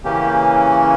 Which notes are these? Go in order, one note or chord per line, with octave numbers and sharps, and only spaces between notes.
C#3 E3 A#3 C#4 G4